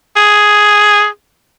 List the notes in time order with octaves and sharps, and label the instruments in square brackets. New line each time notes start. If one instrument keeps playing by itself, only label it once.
[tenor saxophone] G#4